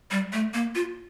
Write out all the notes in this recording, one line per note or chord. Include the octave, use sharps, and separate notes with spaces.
G3
A3
A#3
F4